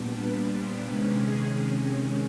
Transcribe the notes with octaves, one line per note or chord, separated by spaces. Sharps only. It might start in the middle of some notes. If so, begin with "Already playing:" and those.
Already playing: A#2 G3 B3 D4
B4
C5
C3 D#3 G#3 C#4 B4
G#4